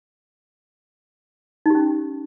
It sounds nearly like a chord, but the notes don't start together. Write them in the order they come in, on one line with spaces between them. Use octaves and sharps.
D#4 G4 C#4